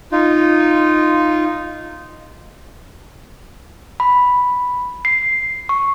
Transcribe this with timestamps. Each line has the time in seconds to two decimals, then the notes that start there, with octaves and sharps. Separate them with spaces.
0.12 D#4 F4
4.00 B5
5.05 C7
5.69 C#6